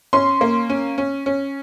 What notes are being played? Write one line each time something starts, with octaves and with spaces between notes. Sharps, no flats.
C#4 C6
A#3
C#4
C#4
C#4